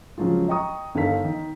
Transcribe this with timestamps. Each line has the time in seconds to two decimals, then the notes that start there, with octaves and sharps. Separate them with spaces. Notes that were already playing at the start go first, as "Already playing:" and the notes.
0.18 C#3 F3 F#3 G#3 F4
0.48 D#5 G5 A#5 C#6 D#6
0.95 G1 D#3 A4 A#4 F5 B6
1.24 D#3